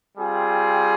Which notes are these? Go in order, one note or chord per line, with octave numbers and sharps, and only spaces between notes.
G3 C4 F4 G#4